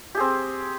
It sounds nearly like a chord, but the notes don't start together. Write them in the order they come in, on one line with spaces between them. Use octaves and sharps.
G4 G#4 C4